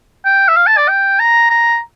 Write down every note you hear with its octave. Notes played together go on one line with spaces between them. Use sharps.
G5
E5
F5
A5
D5
G5
A#5
A#5